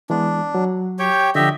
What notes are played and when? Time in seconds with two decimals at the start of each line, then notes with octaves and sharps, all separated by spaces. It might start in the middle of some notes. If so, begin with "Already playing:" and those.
0.10 E3 G#3 B3 D4
0.55 F#3
0.99 G4 C#5 G5
1.35 D3 F3 G4 D#5 E5